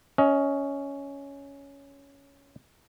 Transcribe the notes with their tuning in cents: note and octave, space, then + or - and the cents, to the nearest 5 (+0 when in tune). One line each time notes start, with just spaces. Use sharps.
C#4 +10 D#5 +30